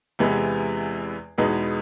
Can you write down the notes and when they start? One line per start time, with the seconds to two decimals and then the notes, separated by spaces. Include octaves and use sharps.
0.19 E2 C3 E3 G#3 B3
1.38 E2 B2 G#3 B3 D#4